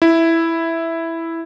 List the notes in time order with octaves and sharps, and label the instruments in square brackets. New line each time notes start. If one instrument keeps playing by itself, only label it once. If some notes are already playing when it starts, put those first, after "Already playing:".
[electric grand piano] E4